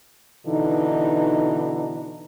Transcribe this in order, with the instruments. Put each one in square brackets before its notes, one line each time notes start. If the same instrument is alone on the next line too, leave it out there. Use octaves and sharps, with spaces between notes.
[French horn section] B2 D3 E3 D#4